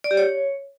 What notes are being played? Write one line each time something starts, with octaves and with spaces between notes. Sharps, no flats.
D5
G4
C#5